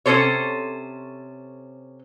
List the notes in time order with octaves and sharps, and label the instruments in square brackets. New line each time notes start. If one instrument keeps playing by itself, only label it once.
[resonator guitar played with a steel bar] C3 C#4 F4 A4 C5 C#5